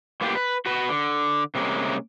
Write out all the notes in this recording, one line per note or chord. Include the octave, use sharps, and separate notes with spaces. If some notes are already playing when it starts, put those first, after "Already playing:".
A2 A#3 B3 F4 G4
B4
F#4 B4
D3
C3 G3 G#3 A#3 C#4